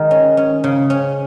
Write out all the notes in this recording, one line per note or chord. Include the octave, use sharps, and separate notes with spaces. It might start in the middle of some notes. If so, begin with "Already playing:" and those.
Already playing: D#3 G#3 G#4
C#4
C#4
C#3
C#4